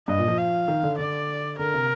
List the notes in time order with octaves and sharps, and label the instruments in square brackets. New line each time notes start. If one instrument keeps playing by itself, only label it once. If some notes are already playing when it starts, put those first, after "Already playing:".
[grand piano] G2 [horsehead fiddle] D#5
[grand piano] A#2
F3
[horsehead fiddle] F5
[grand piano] D#3
D3
[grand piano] D3 [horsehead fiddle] D5
[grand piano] D3 [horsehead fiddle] A#4
[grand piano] C3